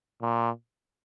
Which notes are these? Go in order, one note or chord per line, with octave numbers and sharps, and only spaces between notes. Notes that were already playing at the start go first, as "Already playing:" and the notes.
A#2